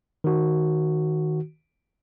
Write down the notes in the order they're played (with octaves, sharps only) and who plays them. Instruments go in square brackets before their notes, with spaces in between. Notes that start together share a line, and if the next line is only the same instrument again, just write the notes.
[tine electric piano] D#3 F#4